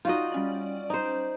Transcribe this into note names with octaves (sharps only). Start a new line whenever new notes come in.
D#4 F4 F#4 D5 D#5
G3 C#4 D5
D#4 C5